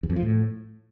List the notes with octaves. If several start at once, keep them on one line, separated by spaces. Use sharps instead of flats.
E2
F2
F3
A2